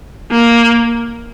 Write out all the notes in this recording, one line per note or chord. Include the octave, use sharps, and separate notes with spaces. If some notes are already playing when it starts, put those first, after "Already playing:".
A#3